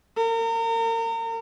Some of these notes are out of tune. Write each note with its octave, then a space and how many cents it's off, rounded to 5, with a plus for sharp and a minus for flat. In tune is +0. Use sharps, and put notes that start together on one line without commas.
A#4 -35